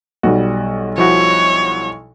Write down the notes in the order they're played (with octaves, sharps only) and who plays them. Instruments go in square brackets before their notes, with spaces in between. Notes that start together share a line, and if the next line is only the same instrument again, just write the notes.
[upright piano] B1 G3 [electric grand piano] F#4
[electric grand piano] F3 E4 F#4 [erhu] C#5